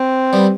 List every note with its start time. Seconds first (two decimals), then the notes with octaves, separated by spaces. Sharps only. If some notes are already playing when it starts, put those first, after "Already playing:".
Already playing: C4
0.33 G3 B3